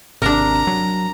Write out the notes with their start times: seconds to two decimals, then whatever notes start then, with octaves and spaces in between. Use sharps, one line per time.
0.22 G#1 C3 D4 A#4 A#5
0.67 F#3